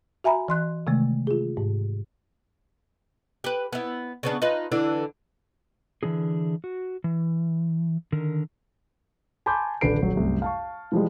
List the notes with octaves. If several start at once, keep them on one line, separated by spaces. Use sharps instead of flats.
F#4 E5 G#5 A#5 B5
E3 C6 F#6
C3 D#3 G#3 A3
F4 G#4
G#2
G4 B4
B3 E4
C#3 B3 D4
D#4 F4 B4
D3 E3 D4
D3 E3 D4 D#4 G#4
F#4
E3
D3 D#3 A#4
G#5 A5 B5 C6 D6 G6
D#1 D3 D4 B4 C7 D7
D#1 F#3
C2 F#2 A2
F5 A5 C#6
E3 F3 G3 G#3